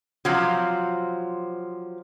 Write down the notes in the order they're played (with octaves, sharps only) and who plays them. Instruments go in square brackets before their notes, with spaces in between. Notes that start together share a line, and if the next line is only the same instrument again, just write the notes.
[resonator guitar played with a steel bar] C3 F3 F#3